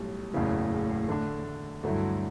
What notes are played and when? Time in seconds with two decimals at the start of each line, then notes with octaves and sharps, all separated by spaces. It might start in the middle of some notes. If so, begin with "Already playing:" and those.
Already playing: B1 A2 G3
0.34 F#1 E2 A2 C#3 E3
1.08 D3 A3 D4
1.83 D2 G2 D3 F#3 A3 E4